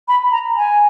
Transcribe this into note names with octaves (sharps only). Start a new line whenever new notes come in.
B5
A#5
G#5